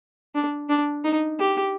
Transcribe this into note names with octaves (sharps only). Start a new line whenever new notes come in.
D4
D4
D#4
G4